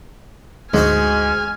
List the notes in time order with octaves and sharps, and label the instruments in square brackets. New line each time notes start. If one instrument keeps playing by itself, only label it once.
[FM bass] D2 [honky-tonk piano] G#2 [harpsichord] G#3 F#4 C5 [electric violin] G#5 F6